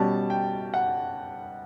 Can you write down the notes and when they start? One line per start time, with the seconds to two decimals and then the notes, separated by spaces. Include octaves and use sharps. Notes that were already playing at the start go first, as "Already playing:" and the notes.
Already playing: B2 G3 C#4 A5
0.30 G5
0.74 F#5